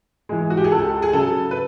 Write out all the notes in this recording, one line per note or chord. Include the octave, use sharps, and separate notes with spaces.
E3 G#3
F#4
G4
G#4
C#2 A4
G#4
C#3 F#3 A4
B4